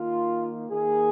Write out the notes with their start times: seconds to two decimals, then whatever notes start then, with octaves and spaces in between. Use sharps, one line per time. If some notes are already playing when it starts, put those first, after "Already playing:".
Already playing: D#3 A#3 F4
0.70 D#3 A#3 G#4